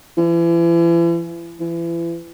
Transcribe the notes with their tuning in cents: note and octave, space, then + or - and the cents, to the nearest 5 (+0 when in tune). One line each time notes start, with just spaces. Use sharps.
E3 +40
E3 +35